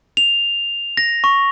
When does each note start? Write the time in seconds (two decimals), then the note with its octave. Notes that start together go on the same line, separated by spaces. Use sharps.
0.17 F7
0.97 A#6
1.24 C#6